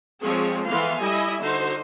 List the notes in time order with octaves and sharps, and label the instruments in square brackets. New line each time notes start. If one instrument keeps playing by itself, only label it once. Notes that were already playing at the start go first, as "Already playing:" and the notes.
[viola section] F3 G#3 C4 G#4 C#5
E3 B3 A4 F5 C6
G3 E4 D#5 G#5
D3 D#4 F#4 C5 C6